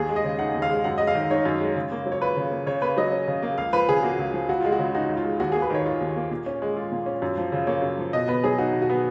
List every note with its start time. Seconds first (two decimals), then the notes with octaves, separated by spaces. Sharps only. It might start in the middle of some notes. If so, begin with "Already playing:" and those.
Already playing: D#2 G#4
0.09 G#3
0.16 D#5
0.24 C#3
0.39 D#4 F#5
0.54 D#2
0.62 F5
0.70 G#3
0.84 F#2 F#5
0.98 G#3 D#5
1.07 F5
1.15 D#3
1.30 D#4 C#5
1.45 F#2
1.60 G#3
1.76 C#3
1.92 A#3
2.06 F#3
2.12 C#5
2.21 F4 B4
2.36 C#3
2.51 A#3
2.66 C#3 C#5
2.82 A#3 B4
2.97 F#3 D#5
3.12 C#4
3.28 C#3
3.42 A#3
3.58 C#2 F5
3.73 F3 B4
3.89 C#3 G#4
4.03 A#3 F#4
4.19 C#2
4.33 F3
4.49 C#2 F#4
4.61 G#3 F4
4.72 F#4
4.79 C#3
4.95 D#4 F#4
5.09 C#2
5.17 F4
5.24 G#3
5.40 D#2 F#4
5.52 G#4
5.55 A#3
5.62 B4
5.70 D#3 C#5
5.86 F4
6.01 D#2
6.16 A#3
6.31 A#2
6.46 C#4
6.62 G#3
6.77 F4
6.92 A#2
7.06 C#4
7.22 F#2
7.37 F3
7.52 C#3
7.67 A#3 C#5
7.82 F#2
7.98 F3
8.13 B2 D#5
8.28 B3 B4
8.44 F#3 G#4
8.58 D#4 F#4
8.73 B2
8.82 F#4
8.89 B3